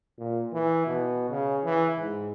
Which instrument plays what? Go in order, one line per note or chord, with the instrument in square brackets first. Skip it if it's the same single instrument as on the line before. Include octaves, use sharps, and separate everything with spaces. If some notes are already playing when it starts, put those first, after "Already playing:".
[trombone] A#2
E3
B2
C#3
E3
G#2